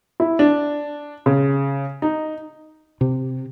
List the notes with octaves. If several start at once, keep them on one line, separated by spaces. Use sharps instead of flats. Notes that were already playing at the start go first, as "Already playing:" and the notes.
E4
D4
C#3
D#4
C3